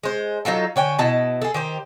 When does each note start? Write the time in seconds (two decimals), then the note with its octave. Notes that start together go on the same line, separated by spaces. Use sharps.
0.03 G#3 C5
0.45 F#3 D#4 F4 A4
0.76 D3 C#5 G5 G#5
0.99 B2 E4 D#5 A5
1.42 G#4 A4
1.54 D#3 G4 C5